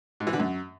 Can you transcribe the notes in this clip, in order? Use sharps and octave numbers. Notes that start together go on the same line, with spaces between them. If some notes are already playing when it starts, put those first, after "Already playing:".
G#2
E3
D3
F#2